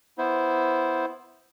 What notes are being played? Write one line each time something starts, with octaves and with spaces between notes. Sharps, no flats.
B3 E4 C5